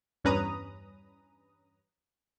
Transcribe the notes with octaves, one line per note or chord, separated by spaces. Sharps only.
E2 G2 C#4 B4 A#5 D#6